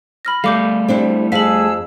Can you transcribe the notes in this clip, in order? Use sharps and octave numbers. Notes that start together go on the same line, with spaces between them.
B5 F6 A#6
G3 A3 A4 F5 D6 G6
C4 D4 E4
F2 G#4 F5 A5 E6 B6 F#7